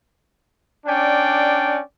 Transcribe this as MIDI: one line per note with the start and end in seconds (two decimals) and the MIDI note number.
0.86 1.81 61
0.86 1.81 62
0.86 1.81 74
0.86 1.81 79